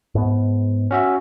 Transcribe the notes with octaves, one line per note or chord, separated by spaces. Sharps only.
G#2 B3
C#4 F#4 E5